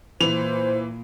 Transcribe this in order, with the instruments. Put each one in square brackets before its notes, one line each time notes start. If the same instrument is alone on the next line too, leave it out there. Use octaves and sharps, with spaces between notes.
[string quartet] A#2 [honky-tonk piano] E3 [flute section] C5 [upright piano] F7